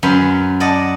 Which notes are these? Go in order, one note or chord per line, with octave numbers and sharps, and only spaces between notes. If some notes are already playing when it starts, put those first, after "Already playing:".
F#2 C#4 B4 C6
D5 D#5 F#5 A5